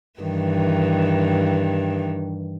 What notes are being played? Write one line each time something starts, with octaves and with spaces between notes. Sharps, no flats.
G2 D#3 E3